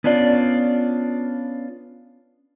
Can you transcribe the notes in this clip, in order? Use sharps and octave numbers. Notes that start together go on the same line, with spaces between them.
B3 C#4 D4 F4 D5